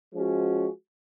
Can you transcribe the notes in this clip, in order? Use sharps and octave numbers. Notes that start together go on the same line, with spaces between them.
F3 G#3 C#4 F#4